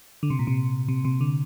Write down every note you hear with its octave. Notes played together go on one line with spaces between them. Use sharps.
D3
C3
A#2
C3
C3
C3
D3